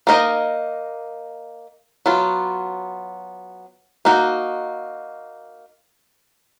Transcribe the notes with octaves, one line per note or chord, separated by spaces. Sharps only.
A#3 D#4 A#4 D#5
F#3 B3 F4
A#3 D#4 F#4